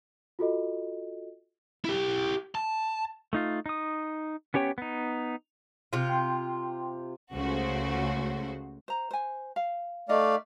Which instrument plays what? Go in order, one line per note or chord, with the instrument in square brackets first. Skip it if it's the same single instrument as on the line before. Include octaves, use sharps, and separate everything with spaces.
[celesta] F4 F#4 A4 D#5
[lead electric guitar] E4 G4
A5
[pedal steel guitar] A3 D#4 F4
D#4 D#6
B3 C#4 G4 C#5 G5
B3 D#4
[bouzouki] C3 F4
[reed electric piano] G5 C6
[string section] C#2 C#3 A3 F#4 C5
[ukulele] C5 A#5
C5 G#5
F5
[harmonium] A3 D5 F5 [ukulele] D#4 D#5